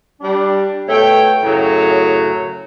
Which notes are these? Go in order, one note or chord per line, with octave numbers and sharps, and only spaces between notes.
G3 D4
B2 A3 C#5 G5
F#2 A2 C#3 F#3